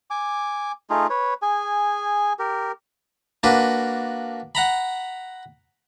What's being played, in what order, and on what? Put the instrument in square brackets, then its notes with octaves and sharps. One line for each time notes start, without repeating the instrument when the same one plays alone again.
[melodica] G#5 D6
A3 D#4 F4 G#4
B4 C#5
G#4 G#5
G4 A#4
[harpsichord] A#3 D4 F#4 B4
F#5 A#5 B5